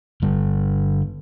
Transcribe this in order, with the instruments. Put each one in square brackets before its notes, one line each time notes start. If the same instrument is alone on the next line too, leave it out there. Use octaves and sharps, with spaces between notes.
[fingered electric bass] G2 D3 G3